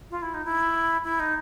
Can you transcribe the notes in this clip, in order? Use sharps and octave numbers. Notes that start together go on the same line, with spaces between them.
F4
E4
D#4
E4
E4
D#4